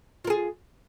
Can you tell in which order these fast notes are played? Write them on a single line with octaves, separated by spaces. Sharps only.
F4 A#4 G#4